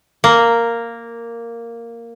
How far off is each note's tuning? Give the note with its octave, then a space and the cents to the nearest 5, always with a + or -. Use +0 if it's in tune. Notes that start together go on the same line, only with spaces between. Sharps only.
A#3 -5